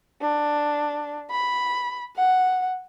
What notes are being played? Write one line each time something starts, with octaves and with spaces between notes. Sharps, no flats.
D4
B5
F#5